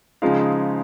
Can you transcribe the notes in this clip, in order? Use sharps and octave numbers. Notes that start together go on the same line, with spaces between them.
C#3 F3 G#3 D#4 F5